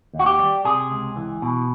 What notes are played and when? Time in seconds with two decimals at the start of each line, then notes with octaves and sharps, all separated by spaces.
0.14 D#2
0.19 F#4
0.26 G4
0.39 G3
0.65 C3 G#4
0.90 C#2
1.16 E3
1.42 B2